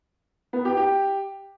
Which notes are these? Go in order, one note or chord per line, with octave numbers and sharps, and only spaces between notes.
B3
G4
G4